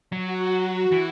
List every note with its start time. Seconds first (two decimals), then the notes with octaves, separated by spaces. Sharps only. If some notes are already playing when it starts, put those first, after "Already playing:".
0.12 F#3 F#4
0.52 F#4
0.92 E3